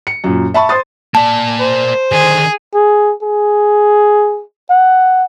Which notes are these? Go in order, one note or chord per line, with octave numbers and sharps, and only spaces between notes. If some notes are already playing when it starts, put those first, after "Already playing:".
C#7
F#2 A#2
E5 A5 B5 C#6
C5 C6 D#6 A6
A#3 D5 A5
C5
D3 D#3 G#4
G#4
G#4
F#5